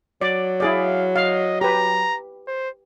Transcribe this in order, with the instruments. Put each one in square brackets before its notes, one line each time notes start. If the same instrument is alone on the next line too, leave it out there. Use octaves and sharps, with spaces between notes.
[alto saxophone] F#3 [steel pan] D5
[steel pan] E4 G#4 D5 [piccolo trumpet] F5
[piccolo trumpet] D#5 [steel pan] F5
[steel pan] G4 B4 [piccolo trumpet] A#5
[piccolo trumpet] C5